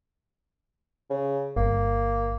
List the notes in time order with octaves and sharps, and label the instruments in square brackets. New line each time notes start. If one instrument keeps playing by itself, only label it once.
[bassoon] C#3
[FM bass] G1 [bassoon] A#3